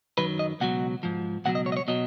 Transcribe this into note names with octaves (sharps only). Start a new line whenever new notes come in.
F#2 D#3 F#3 B4
D#5
C#2 B2 F#3 F#5
G#2 F3
C#2 B2 F#3 F#5
D#5
C#5
D#5
C#5
B2 F#3 D#5